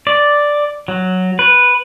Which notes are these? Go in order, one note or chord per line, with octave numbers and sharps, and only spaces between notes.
D5
F#3
B4